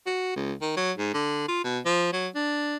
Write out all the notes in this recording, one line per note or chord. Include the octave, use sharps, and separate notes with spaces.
F#4
C#2
D#3
F#3
G#2
D3
F4
B2
F3
F#3
D4